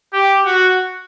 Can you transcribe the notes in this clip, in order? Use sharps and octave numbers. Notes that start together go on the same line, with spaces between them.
G4
F#4